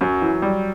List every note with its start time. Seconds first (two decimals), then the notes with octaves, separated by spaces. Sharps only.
0.01 F#2 F#3
0.22 E3
0.42 G3